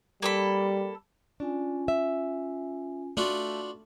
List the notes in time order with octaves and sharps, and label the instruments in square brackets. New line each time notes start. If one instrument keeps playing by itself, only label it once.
[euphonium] G3 [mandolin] A#3 A4 B5
[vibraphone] C#4 F4 G#5 [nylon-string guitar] D4
[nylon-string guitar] E5
[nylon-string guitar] A3 [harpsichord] D4 F4 F#4